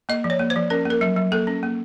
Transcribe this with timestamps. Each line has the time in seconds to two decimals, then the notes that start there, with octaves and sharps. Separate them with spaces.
0.09 A#3 D#5
0.24 F3
0.30 C#5
0.39 A#3
0.50 C5
0.56 F3
0.70 C#4 A#4
0.85 A#3
0.90 A#4
1.01 F#3
1.16 F#3
1.32 A#3 A4
1.47 C#4
1.63 A#3